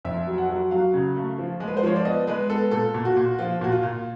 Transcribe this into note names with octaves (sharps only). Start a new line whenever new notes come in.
F2 E5
F#3
F#5
F#3
F#3 F5
C#3
A3
F3
G#3
B4
C5
F3 C#5
D5
B3 D#5
G#3 B4
B3 A4
A#2 A4
A#2
F#4
A#2
F3 F4
A#2 F#4
F4
A#2